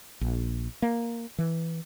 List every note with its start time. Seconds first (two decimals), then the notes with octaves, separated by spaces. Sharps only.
0.21 A#1
0.82 A#3
1.38 E3